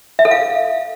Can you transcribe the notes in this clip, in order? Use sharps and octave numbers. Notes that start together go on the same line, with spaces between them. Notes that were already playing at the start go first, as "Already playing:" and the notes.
E5
A4
F5